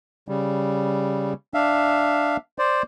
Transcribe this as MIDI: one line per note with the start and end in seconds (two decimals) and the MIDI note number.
0.28 1.33 49
0.28 1.33 55
1.54 2.37 62
1.54 2.37 76
1.54 2.37 77
2.59 2.83 72
2.59 2.83 74